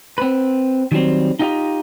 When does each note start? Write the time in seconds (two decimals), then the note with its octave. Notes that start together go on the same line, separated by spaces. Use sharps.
0.18 C4 B4
0.92 D#3 F#3 G3 C4
1.39 D#4 F4 G4 D#5